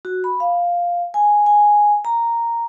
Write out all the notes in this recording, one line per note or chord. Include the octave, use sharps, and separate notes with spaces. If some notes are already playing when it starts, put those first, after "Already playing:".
F#4
B5
F5
G#5
G#5
A#5